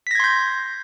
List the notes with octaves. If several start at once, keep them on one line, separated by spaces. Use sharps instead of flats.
C6 G6 G#6 A#6 B6